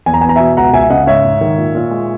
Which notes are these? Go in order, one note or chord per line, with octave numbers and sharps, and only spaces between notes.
E2 G#5
A#5
B3 G#5
A#5
B2 E5 G#5
C#2 F#5 A#5
C#2 E5 G#5
C#3 D#5 F#5
G#2 C#5 E5
G#2
D#3
A#2
A#2
G#3